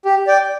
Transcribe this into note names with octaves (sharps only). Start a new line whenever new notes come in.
G4
D5 G5